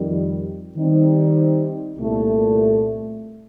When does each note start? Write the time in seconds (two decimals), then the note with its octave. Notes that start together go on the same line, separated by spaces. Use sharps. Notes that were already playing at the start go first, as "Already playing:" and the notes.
Already playing: F2 D#3 G3
0.75 D#3 G3 C4 D#4
1.98 C2 A#2 A3